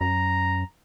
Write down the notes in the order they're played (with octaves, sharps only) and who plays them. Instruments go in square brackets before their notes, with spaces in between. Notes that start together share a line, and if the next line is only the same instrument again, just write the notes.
[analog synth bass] F#2 [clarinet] A#5